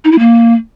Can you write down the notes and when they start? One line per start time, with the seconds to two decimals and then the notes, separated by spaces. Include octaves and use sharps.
0.05 D#4
0.12 E4
0.19 A#3